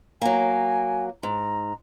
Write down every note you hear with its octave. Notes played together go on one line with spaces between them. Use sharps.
F#3 A#3 G#5
G#2 A#5